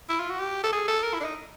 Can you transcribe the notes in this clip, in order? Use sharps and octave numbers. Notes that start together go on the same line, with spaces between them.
E4
F4
F#4
G4
A4
G#4
A4
A#4
E4
D4
D#4